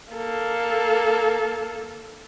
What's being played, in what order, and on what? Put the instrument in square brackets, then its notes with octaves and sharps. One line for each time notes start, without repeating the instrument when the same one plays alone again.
[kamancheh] A#3 A4